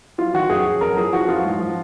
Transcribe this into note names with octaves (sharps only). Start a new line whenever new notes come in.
F#3 F4
D#3 F#4
F#2 G#4
F#2
F#2 A#4
F3 G#4
F3 F#4
F#2 F4
G#2
F3